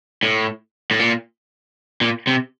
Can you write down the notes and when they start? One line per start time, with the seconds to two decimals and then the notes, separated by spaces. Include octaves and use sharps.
0.23 A2
0.91 A2
0.99 A#2
2.01 A#2
2.27 C3